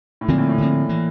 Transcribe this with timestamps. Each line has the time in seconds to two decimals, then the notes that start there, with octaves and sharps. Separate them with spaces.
0.21 A2
0.28 A#2 D3 F3 C4
0.38 A2
0.49 A2
0.58 A#2 D3 F3 C4
0.89 E3 A#3